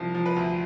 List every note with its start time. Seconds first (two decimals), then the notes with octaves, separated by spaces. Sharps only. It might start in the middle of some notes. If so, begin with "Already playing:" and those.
Already playing: C2 F3
0.14 F3
0.26 B4
0.36 D2